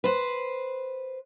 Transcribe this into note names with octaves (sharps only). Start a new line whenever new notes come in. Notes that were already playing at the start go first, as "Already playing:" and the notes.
B4 C5